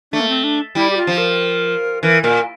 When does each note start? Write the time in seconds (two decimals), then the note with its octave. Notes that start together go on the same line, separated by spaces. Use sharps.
0.12 A3 D4
0.20 A#3
0.28 C4
0.44 D4
0.75 G3 E4
0.90 G4
0.97 F4
1.07 F3
1.18 A#4
2.03 E3 A#4
2.23 A#2 A#4